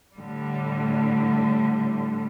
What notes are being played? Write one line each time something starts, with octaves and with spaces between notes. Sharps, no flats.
A2 D3 G3